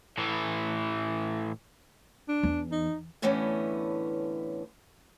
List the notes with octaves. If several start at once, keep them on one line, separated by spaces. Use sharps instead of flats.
A2 E3
D4
E2
D#4
A2 D3 E3 A3 B3 C#4